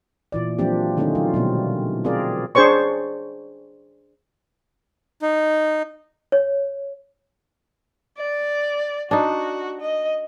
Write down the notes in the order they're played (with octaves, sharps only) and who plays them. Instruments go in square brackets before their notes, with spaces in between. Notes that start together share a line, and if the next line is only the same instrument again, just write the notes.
[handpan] A#2 E3 D5
F3 F#3 A#3 C4 D4 G4
D3 D#3 A3 C4 C#4 D#4
F#3 F4
B2 F#3 G3
C4 F4 G#4 A#4 D5
[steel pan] D4 G#4 C5 C#5 C#6
[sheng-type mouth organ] D#4
[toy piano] C#5
[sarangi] D5
[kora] D4 D#4 [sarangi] F#4
[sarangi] D#5